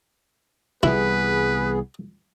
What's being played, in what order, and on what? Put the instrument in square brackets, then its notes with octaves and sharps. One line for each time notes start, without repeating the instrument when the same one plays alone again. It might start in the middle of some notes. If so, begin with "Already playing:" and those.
[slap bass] C2 E3 G3 [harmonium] B3 G#4 [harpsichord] E4 [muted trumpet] B4